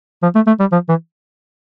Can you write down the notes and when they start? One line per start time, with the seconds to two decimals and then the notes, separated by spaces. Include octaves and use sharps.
0.23 F3
0.35 A3
0.47 A3
0.60 G3
0.73 F3
0.89 E3